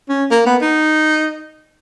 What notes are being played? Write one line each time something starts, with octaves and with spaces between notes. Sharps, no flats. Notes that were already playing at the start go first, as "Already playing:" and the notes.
C#4
A#3
B3
D#4